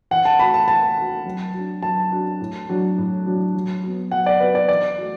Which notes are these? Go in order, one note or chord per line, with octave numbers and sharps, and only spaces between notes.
E3 F#5
A5
A3 F#4 B5
A5
E3 A5
A3 F#4
F#3
D4 F#4
F#3 A5
D4 F#4
A2
F#3 D4 F#4
A2
F#3 D4 F#4
F#3
B3 F#4
F#3 F#5
D5
B3 F#4 B4
D5
E3 D5
A3 F#4